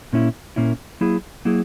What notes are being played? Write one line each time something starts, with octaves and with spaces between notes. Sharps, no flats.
A#2 A#3 C#4 E4
A#2 A#3 C#4 E4
F#3 A#3 E4 G#4
F#3 A#3 E4 G#4